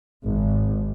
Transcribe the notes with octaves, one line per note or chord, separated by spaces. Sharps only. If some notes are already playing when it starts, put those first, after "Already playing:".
G#1